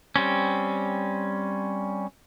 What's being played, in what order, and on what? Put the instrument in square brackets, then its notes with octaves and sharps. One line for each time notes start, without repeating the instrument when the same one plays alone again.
[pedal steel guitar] G3 C4 C#4